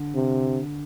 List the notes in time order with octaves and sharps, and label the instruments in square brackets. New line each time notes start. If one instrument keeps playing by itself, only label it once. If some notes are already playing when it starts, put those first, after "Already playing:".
Already playing: [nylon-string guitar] D3
[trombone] C3